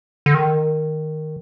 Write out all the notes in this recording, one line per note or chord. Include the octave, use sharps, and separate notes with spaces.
D3
D#3